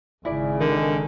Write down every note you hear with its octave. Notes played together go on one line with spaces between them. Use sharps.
G#1 C#3 E4 D5
D3 D#3